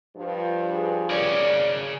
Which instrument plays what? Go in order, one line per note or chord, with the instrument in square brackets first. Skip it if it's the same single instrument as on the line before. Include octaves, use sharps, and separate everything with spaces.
[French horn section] G2 F3
[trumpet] G#4
[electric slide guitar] G#4 A#4 C#5 [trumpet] D5